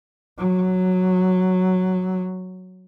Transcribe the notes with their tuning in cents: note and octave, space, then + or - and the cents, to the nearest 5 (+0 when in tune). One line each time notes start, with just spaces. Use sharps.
F#3 -5